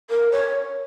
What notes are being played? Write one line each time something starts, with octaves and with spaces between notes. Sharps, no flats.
A#4
C#5